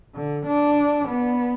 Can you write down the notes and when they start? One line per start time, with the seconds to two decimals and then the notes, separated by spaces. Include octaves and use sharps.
0.15 D3
0.46 D4
1.08 B3